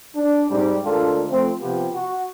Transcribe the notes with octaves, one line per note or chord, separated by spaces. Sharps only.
D4
G#2 C3 G3
D2 G#3 D4 F4 A4 A#4
F3 A3 C4
C3 F3 B3 F4 G4
F#4